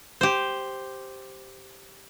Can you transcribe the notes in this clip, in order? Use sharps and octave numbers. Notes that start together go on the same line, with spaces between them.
G4 C5